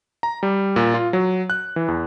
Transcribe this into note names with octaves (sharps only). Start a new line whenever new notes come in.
A#5
G3
A#2
F4
F#3
F#6
E3
E2